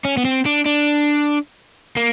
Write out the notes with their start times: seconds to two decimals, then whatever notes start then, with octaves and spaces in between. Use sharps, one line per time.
0.05 C#4
0.17 B3
0.25 C4
0.46 D4
0.66 D4
1.97 A#3